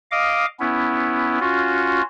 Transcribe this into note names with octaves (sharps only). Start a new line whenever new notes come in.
D#5 F5 D6
B3 C#4 E4
C#4 F4 F#4